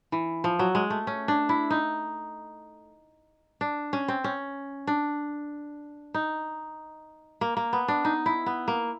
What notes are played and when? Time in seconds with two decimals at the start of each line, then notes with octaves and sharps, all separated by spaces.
0.12 E3
0.44 F3
0.59 F#3
0.75 G#3
0.90 A3
1.07 C#4
1.28 D4
1.49 E4
1.71 D#4
3.61 D4
3.93 C#4
4.08 C4
4.24 C#4
4.87 D4
6.14 D#4
7.41 A#3
7.57 A#3
7.73 B3
7.88 D4
8.05 D#4
8.26 E4
8.46 B3
8.68 A#3